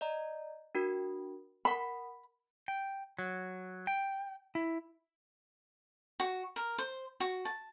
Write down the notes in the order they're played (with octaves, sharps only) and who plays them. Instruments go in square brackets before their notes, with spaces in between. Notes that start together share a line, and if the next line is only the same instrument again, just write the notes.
[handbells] D5 D#5 A#5
D4 F#4 A#4
[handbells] A#4 F#5 [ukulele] B5
[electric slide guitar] G5
F#3
G5
E4
[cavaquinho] F#4
A#4
C5
F#4
A5